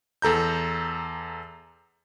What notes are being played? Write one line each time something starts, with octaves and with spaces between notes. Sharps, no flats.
E2 A4 A#5 G6